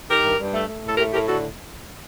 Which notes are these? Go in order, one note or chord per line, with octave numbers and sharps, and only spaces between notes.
D#3 G4 A#4
G2
G2
A3
A3
A2 A4
A3 G4 A#4
A2 G4 A#4
D3 F#4 A4